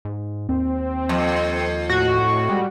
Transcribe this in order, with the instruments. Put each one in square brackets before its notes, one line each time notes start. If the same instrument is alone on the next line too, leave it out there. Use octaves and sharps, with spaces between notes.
[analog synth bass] G#2
[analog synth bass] D#2 [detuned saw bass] C4
[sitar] F2
[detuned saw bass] A2 [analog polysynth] F#4
[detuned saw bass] G3 [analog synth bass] G#3